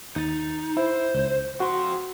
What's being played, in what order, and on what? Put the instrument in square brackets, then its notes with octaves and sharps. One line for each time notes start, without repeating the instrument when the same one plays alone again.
[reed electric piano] D#2 A6 [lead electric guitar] D#4
[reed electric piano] E4 [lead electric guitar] C5
[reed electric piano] C#2 G6
[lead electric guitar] F2 C6 [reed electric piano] F#4